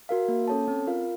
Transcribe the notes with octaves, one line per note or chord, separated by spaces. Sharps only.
F#4 A#4 F5
A#3
C#4 A4 C#5 A5
C4
F4 A#4 F5